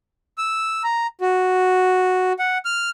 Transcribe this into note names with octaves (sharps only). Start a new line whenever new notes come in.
E6
A#5
F#4
F#5
F6